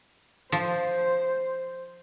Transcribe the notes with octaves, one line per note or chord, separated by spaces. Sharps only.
F3 C5